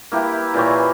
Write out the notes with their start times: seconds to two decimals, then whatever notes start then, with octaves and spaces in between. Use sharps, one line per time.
0.12 A#3 E4 G4 B4
0.54 A#2 E3 G4 C#5